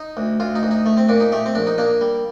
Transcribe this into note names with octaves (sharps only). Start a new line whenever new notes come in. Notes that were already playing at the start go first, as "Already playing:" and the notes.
Already playing: D#4
D2
D2 F4
D#4
D2
D#4
A3
C4
A#2 D4
D#4
A3 G4
C4
A#1 D4
D#4
A#3 D4
G3